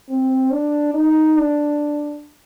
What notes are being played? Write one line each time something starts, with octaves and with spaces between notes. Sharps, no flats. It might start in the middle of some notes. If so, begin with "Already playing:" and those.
C4
D4
D#4
D4